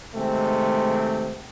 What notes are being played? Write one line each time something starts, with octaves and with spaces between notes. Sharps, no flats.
C3 D#3 G#3 A3 C4